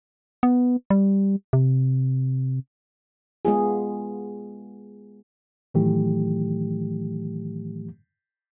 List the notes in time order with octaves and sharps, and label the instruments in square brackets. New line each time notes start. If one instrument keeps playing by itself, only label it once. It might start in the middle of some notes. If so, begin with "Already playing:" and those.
[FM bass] B3
G3
C3
[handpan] G#3 B3 F4 G#4
[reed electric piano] A2 D#3 E3 F#3 A3 G4